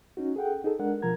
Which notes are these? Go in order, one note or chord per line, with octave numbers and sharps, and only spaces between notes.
C#4 D#4 F#4
G#4 A4 F#5 G5
D#4 G#4 A4
G#3 D4 A#4 F#5
B2 F3 A#4 A#5 G#6